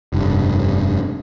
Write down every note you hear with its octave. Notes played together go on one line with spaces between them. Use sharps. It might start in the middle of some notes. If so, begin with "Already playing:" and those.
F1 G2